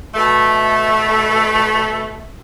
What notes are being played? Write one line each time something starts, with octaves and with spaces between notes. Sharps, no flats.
B2 A3